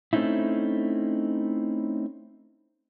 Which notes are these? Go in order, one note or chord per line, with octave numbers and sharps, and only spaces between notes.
A3 C4 C#4 D#4 E4